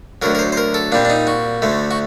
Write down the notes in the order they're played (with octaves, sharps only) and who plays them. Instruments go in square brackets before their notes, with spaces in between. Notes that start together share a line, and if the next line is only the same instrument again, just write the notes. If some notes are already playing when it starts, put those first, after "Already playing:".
[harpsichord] D2 D3 F#3 A#4
A#4
C5
C5
A#4
A4
A#2 G3 C4 D4
D4
D#4
F#4
D2 D3 A3
F#4